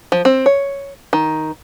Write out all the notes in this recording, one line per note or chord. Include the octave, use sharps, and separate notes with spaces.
F3
C4
C#5
D#3